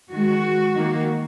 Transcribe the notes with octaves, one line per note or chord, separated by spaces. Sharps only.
D#3 G#3 F#4
D#3 A#3